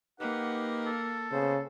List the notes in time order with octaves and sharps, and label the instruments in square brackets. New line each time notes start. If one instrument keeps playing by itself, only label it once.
[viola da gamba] A#3 [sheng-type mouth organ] D#4 G4 B4 [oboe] F#5
[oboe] A4
[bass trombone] C#3 [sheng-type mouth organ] B3 C5